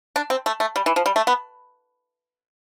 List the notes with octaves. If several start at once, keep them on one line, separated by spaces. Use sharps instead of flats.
D4
C4
A3
A3
G3
E3
F3
G3
A3
B3